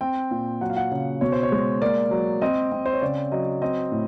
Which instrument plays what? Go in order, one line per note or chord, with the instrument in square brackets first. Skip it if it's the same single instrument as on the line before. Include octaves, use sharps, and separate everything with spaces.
[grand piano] C4 G5
A#2
F#3 F#5
F5
F#5
C#3
B2 C#5
C5
C#5
G#3
A#3 D5
F#3
C4 D#5
C4
C5
C#5
C#3 D5
F#3 D#5
C4 D#5
A2